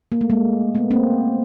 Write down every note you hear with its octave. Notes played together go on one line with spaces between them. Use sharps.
A#3
A3
G#3 A#3
A3 B3
A#3 C4